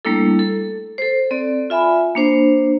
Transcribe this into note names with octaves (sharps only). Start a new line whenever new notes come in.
G3 A3 A#3 D4 E4 A4
A4
A4 C5
C4 A4 D5
F4 E5 G#5 B5
A#3 D4 C5